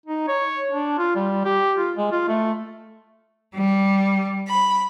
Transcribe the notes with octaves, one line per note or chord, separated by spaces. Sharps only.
D#4
C#5
D4
F4
G3
G4
F4
G#3
F4
A3
G3
B5